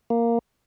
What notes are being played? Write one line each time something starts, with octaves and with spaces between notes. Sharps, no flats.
A#3